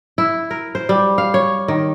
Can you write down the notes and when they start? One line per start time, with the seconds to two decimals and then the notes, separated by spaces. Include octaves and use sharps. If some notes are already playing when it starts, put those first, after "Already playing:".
0.18 E4
0.51 A#4
0.75 C5
0.89 G3
1.18 F5
1.34 C#5
1.68 D#3